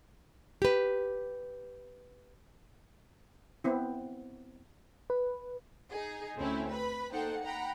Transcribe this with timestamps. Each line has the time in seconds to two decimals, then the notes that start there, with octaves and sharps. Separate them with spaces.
0.62 G4 B4
3.64 B3 C4 E4
5.10 B4
5.90 D#4 G#4
6.36 D2 A3 C4 C#4 E4
6.69 B4 B5
7.13 A#3 D#4 A4 C5 F#5 G5
7.43 F#5 G5 A#5 B5